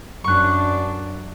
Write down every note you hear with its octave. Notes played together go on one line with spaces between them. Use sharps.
F#2 D4 C#6 F#6